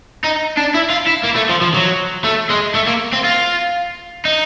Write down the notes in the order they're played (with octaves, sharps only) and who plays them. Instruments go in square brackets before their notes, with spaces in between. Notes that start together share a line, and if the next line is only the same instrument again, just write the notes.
[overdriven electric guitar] D#4
D4
E4
F4
E4
A#3
A3
F3
F3
F#3
A3
G#3
A3
A#3
C4
F4
D#4